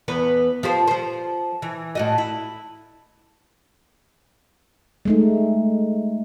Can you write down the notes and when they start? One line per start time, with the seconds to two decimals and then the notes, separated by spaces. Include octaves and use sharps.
0.08 E2 B3 B4
0.63 F3 G4 C5
0.88 F3 C5
1.62 E3
1.95 A2 F#4 D#5
2.18 E4
5.05 G#3 A3 D#4